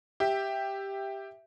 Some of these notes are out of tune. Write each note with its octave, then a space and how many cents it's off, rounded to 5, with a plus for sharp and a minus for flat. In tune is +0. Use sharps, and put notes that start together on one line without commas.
G4 +0 E5 +0